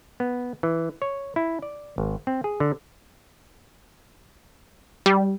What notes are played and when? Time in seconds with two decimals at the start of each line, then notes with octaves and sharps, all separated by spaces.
0.20 B3
0.63 E3
1.02 C#5
1.36 E4
1.62 D5
1.98 G#1
2.27 C4
2.44 G#4
2.60 D3
5.06 G3